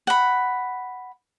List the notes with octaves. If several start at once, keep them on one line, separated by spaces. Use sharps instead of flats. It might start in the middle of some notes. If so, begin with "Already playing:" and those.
F#5 B5